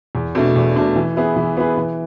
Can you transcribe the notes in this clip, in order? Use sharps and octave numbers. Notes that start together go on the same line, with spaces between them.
E2
B2 A3 D4
E2
B2 A3 D4
E3
B3 E4 G#4 B4
E3
B3 E4 G#4 B4
E3